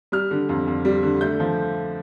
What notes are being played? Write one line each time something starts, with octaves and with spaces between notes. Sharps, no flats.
G3 F6
D3
F2
F2
G3
D3
A3 G6
F3